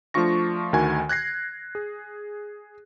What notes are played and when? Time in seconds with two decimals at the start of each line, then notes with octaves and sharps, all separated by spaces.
0.14 F3 A3 D4 F4 C#6 A#6
0.73 D2 D#3 F#4 G#5
1.09 F#6 G#6 A#6 C7
1.75 G#4